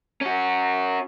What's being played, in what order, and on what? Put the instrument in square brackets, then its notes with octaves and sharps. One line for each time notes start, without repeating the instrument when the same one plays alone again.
[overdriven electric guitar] C#4 F#4